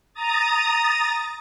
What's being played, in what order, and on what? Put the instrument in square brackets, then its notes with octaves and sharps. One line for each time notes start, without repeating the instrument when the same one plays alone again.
[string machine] A#5 D#6 A6